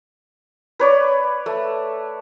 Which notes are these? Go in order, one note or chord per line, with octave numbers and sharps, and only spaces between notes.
B4 C#5 D5
A3